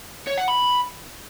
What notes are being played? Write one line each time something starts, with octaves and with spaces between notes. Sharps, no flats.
C#5
F#5
B5